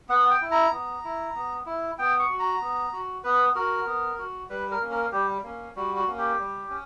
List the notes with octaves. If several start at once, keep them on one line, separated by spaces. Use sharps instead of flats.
B3 F#5
G5
E4
A#5
B3
E4
B3
E4
B3 G5
C#6
F#4
A#5
B3
F#4
B3 B4
F#4 A#4
B3
F#4
G3 B4
A#4
A#3 C#4
A#4
G3 G4
A#3 C#4
G3 F#4
F#4
A#3 C#4
G4
G3
C#4